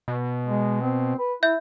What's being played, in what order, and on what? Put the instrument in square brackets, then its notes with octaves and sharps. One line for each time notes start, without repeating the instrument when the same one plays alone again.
[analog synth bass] B2
[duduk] G#3
C4
B4
[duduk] E4 [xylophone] E5 G6